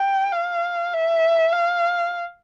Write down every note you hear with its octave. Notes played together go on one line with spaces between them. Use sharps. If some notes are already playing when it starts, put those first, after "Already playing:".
Already playing: G5
F5
E5
F5